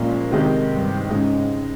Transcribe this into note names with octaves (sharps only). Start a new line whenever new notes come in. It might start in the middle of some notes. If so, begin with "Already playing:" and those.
Already playing: A#2 F3 G#3 C#4
C3 D#3 G#3 D#4 G4
G2
G#2 C#3 G#3 D#4